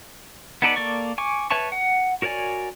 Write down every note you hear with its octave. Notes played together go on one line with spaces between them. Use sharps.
B3 D#4 A4 B4 D5
A#3 A4 D5 C#6
G#5 C#6 D6
B4 C#5 E5 A5 C#6
F#5
F#4 A#4 C#5 D5 G#5